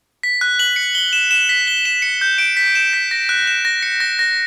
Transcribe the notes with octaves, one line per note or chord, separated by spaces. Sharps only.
B6
F#6
F#7
C#7
G7
E7
E7
B6
G7
E7
C#7
G6
D7
B6
E7
B6
A#6
F#6
E7
A#6
C#7
A#6
A#6